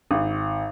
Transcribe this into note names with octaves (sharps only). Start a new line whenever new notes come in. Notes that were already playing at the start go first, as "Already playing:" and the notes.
G#1